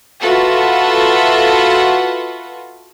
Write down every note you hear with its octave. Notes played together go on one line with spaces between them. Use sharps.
F4 F#4 A4 B4 E5 F#5